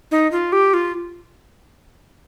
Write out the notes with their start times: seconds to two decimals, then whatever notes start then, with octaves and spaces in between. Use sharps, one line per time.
0.11 D#4
0.32 F4
0.52 G4
0.74 F4